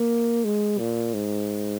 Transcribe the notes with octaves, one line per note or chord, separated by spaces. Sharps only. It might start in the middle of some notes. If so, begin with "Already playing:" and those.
Already playing: A#3
G#3
A#2
G#2